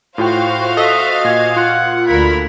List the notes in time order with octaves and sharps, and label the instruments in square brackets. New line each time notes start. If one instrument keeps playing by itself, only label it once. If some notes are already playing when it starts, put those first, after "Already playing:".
[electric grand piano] A2 F4 G5 [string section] F#4 C5 F5
[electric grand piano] A4 [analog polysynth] D#5 [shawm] E5
[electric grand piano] A#2 [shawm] G#5
[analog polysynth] F4 [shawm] F#5
[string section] D2 A#4 B5 [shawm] E4